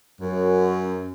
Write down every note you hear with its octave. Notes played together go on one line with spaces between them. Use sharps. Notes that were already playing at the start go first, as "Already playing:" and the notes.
F#2